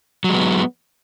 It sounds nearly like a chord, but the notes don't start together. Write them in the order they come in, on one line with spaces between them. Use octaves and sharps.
F#3 G#3 B3